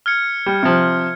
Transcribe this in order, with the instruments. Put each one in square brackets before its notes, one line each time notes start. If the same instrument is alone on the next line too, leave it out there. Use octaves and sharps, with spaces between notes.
[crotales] F6 G#6 C#7
[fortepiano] G3
C3 F3